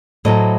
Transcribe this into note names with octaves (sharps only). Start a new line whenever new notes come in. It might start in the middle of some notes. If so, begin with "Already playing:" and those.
A2 F#3 A3 C5 D#5